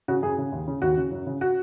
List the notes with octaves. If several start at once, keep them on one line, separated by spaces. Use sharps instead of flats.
C#3 F#4
F#2 G#4
C#3
D#2
C#3
D#2 F#4
C#3
F#2
C#3
F#4